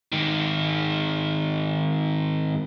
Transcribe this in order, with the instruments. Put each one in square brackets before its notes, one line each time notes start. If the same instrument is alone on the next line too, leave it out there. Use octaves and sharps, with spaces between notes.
[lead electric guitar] G#2 D#3